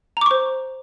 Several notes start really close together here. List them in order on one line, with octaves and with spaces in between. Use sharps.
A#5 D6 C#6 C5